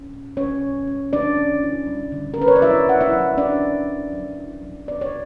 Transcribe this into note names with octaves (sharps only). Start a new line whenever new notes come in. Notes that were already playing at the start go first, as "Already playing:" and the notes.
Already playing: C#4
A#2
G3 C#4 C#5
A#2
C#4
D3 D4 D5
C#4
E4
G3
D3
A#4
C#4 B4
C#5
D5
F#3 E4 E5
E4 F#5
E4 E5
F#3
C#4 D4 D5
F#3
E4
F#3
E4
F#3
B3 D5
C#5